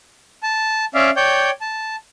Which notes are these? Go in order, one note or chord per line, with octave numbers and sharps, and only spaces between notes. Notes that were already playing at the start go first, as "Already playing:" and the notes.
A5
C#4 D5 E5 F5
C#5 D5 G5 G6
A5